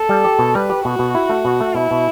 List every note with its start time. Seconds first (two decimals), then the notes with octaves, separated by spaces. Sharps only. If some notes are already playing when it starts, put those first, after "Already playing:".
Already playing: A4
0.09 G3
0.24 G4
0.39 B2
0.55 G3 B4
0.70 G4
0.84 B2 F#4
0.99 B2
1.15 E4
1.29 A3
1.45 B2
1.60 A3
1.75 B2 E4
1.91 B2